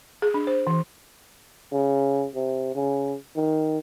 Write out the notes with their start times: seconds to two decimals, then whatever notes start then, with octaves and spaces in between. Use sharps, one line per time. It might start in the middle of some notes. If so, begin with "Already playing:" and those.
0.22 G#4
0.34 D4
0.47 C5
0.67 E3
1.72 C#3
2.35 C3
2.75 C#3
3.36 D#3